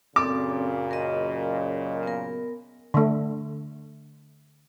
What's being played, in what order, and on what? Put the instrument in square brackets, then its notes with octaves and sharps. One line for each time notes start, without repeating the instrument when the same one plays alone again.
[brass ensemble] F#2 A#2 C#3 [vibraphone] C4 A4 D5 [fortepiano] D6
[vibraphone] A#4 D#5
B3 A#4
[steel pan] D3 A3